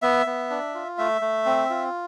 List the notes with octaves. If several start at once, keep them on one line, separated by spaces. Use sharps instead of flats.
B3 E5
B3
D4
F4
A3 E5
A3
C4
F4